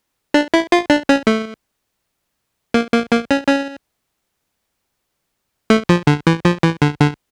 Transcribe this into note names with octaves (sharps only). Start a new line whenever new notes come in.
D4
E4
F4
D4
C#4
A3
A#3
A#3
A#3
C#4
C#4
A3
F3
D3
E3
F3
E3
D3
D3